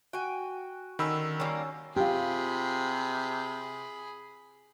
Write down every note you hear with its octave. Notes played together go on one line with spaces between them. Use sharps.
F#4 G5 G#5
D3 D#3 C#4 B5 E6
G3 A#3 C#4
C3 F4 G4 G#4 B5